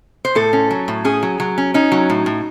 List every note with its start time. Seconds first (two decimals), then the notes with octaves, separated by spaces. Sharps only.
0.25 C5
0.35 A2 A4
0.53 C#4
0.71 F#3
0.88 A2
1.05 C#4 G#4
1.23 F#3
1.40 F#3
1.58 C#4
1.74 C#4 D#4
1.92 F#3
2.10 A2
2.26 A2